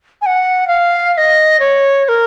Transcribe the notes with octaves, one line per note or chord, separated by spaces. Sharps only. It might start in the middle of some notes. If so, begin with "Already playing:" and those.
G#5
F#5
F5
F5
D#5
C#5
C#5
A#4